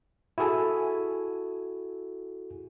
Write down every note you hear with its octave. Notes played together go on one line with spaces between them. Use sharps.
E4 F#4 G#4 A4 G#5